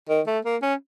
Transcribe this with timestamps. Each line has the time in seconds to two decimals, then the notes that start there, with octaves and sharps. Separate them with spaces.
0.09 D#3
0.27 A3
0.45 A#3
0.62 C#4